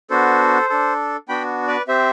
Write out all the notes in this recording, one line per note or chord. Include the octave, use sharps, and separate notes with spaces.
B3 D4 F#4 A4 C5
D4 A4
B3 D4 F#4 G5 B5
B4 D5
C4 G4 C5 E5